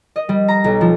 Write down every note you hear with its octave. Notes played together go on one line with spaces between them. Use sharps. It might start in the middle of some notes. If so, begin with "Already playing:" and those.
D#5
G3
A#5
B1
F3